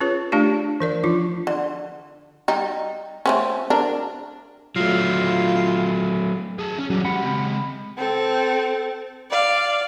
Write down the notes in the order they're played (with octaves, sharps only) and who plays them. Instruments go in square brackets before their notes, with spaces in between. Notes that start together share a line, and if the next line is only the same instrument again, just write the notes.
[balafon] C#4 F4 G#4 B4 C#5
A3 D4 F4 G4 D5
E3 A#4 D5
F3 D4 D#4 F4
[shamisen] D3
G3 D#4
A3 C4 C#4
D4 A#4
[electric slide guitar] F#3 A3 [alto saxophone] F4
[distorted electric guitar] G#4 A5
C#4
[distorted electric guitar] E3 G3 [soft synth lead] F#3
[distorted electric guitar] G#3 G4 [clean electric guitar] F#5 [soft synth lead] B5
[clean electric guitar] C#3 C4
[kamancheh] C4 A4
D5 F5